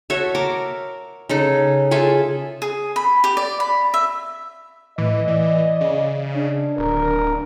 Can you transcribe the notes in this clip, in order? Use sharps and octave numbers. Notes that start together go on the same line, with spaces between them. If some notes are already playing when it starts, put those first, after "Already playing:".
F#4 A4 C#5 E5
A#4 D6
C#3 D#4 A4
F4 G#4 A4 E5
G#4
B5
G4
D5
B5
E5
A2 E3 D#5
E3 D5
C#3
D4
D1 A#4